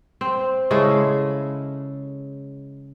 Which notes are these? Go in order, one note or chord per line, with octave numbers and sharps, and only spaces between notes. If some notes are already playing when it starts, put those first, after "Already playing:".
C4
C#3 G#3 E4 A4